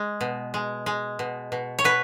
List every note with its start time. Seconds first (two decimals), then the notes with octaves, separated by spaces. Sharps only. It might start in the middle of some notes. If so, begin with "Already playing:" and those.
Already playing: G#3
0.21 B2
0.54 G#3
0.86 G#3
1.19 B2
1.52 B2
1.79 C#5
1.84 B2 B4